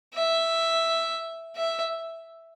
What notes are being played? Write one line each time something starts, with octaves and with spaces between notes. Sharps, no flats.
E5
E5